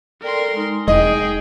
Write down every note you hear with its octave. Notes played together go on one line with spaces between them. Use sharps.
A4 A#4 D5 G5 C6
G#3 D#4
E1 G#4 D#5 G5